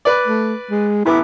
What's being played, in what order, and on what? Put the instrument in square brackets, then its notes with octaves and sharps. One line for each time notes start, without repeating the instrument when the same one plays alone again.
[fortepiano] B4 D5
[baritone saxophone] A3
G#3
[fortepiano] A1 B3 D6 [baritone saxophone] E4